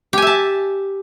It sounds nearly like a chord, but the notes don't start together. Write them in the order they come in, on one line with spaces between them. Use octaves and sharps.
G4 G#5 E5 A5